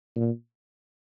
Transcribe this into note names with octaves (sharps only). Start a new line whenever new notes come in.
A#2